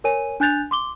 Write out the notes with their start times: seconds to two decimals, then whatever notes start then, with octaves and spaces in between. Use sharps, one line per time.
0.04 A#4 C#5 G#5 D#7
0.40 D4 G#5 F#6 G6 A6 F7
0.71 C6 D6 G7